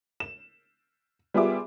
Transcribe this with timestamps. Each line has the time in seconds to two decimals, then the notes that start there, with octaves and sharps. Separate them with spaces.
0.20 E7
1.34 G3 B3 F4 G#4 E5 D6